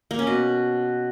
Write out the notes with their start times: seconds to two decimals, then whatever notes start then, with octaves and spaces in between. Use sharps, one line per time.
0.11 A#3
0.19 C#4
0.27 B2